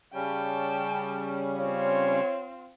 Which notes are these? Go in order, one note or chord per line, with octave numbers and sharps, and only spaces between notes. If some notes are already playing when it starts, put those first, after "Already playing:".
C#3 G3 C#4 G5 A5
C4 F4 C#5